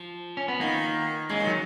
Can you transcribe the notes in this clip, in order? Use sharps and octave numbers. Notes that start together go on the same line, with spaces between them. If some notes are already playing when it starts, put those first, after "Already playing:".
Already playing: F3
C#4
B3
D#3 A#3
C#3 G#3
D#3
F#3